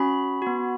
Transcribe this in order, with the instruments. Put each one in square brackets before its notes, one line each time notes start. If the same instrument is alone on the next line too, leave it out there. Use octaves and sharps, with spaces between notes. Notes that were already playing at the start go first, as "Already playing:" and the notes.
Already playing: [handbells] C#4 F#4 B5
B3 F#4